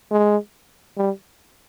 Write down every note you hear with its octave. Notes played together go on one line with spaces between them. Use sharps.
G#3
G3